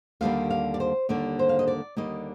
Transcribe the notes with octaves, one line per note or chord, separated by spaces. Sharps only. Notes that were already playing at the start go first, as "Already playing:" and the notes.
D#2 D3 G3 A#3 F5
F5
D5
C5
D#2 D3 G3 A#3 D5
C5
F5
D#5
D5
D#2 D3 G3 A#3 D#5